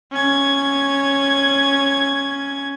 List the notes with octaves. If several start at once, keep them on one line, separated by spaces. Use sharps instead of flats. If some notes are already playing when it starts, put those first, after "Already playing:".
C#4 G#6